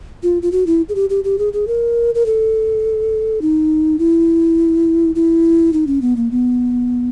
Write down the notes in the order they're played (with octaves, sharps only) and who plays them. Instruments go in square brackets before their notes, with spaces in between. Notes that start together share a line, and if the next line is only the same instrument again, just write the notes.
[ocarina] F4
F4
F#4
E4
G#4
G4
G4
G4
G#4
G#4
A#4
A#4
A4
D#4
E4
E4
D#4
C#4
B3
A#3
B3